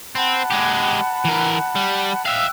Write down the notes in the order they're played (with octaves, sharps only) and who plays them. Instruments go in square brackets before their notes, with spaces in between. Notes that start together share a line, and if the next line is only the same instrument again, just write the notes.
[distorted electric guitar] C4 [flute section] F#5 A5 B5
[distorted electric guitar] G#3 G4
E3 A#4
G3
[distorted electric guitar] E5 F5 [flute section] G5 E6 F#6